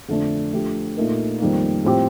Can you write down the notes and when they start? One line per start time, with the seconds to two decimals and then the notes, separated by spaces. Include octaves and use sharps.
0.08 F2 D3 A3 D4
0.52 F3 A3 D4 G4
0.96 A#2 A3 D#4 A#4
1.40 F2 D#3 G3 A#3
1.84 A2 F3 C4 G4